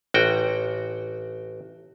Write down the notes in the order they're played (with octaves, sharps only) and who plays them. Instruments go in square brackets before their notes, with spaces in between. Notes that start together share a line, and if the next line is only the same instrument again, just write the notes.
[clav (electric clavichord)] A1 F#4 G5